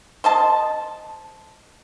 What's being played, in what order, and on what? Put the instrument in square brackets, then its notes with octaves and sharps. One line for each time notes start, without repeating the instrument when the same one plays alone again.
[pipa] C5 D#5 A5